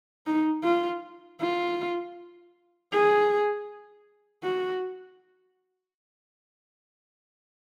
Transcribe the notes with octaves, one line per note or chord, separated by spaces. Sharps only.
D#4
F4
F4
G#4
F#4